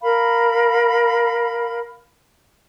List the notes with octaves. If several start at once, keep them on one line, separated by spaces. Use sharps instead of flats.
A#4 F5 B5